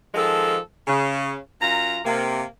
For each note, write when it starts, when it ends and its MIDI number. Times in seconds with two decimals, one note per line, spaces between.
0.14 0.58 51
0.14 0.58 53
0.14 0.58 56
0.14 0.58 69
0.87 1.35 49
1.60 1.99 42
1.60 1.99 65
1.60 1.99 82
2.04 2.44 48
2.04 2.44 58